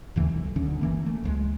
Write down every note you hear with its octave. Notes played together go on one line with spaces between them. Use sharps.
D#2 C#3 E3 A3
B1
D2 D3 C#4
F#1 E3 A#3
A3
C#2 F3 G#3